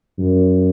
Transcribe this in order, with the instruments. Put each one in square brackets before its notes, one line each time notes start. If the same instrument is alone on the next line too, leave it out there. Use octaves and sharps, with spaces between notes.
[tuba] F#2